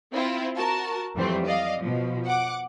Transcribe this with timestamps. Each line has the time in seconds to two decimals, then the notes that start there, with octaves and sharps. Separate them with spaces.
0.12 C4 E4 F4
0.55 F#4 A#4 A5
1.15 F2 E3 F#3 G3 A3 C4
1.46 D5 D#5 F5
1.79 B2 F3
2.26 F#5 D6